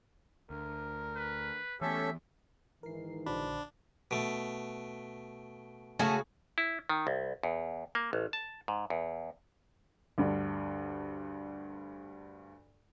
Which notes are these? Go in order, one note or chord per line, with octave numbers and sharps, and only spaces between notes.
D2 A#4
B4
E3 A3 B3 C#4 G4 A4 E5
G#2 D#3 E3 A#4 C7
A#1 D3 D4 F#4 C5 B5
B2 A3
C#3 A3 F#4 G#4 G#5 A5
E4
D#3
C2
E2
A#3
A1
A5
G#2
E2
D2 G2